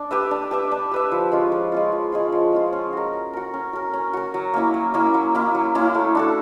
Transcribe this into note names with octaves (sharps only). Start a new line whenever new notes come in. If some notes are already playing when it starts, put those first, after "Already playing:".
Already playing: D4
G4 B4 E5
D4
G4 B4 E5
D4
G4 B4 E5
F3
G#3 C#4 F4
F3
G#3 C#4 F4
F3
G#3 C#4 F4
F3
G#3 C#4 F4
C#4
F#4 A#4
C#4
F#4 A#4
C#4
F#4 A#4
C#4
F#4 A#4
F#3
A#3 C#4 E4
F#3
A#3 C#4 E4
F#3
A#3 C#4 E4
F#3
A#3 C#4 E4
A3
D4 F#4 A4